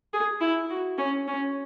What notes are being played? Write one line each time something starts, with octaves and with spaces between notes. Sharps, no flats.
G#4
E4
F#4
C#4
C#4